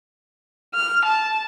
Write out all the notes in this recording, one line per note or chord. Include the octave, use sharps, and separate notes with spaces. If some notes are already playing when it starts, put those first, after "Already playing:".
F6
A5